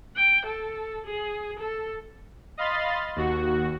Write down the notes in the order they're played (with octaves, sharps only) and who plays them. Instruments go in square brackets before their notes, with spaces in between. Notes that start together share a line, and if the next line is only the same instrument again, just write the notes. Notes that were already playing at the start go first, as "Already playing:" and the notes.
[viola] G5
A4
G#4
A4
[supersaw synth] D#5 F5 B5 C6 A6
D#2 F#4